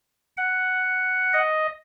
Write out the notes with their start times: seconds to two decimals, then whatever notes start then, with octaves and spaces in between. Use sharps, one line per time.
0.37 F#5
1.33 D#5